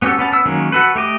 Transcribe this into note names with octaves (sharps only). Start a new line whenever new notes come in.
B3 C#4 F#4 G4 A4
B3 C#4 A5
B3 E6
D#3 F#3 G#3 A#3 C#4
F#4 A4 B4
A3 G4 D#5 D6